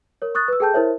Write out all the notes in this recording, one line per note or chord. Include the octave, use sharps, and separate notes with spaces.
A#4 C#5
C#6 D#6 F#6 A6
B4 E6
G#4 A4 G5 A5 G6
E4 A#4 C5 C#5 E5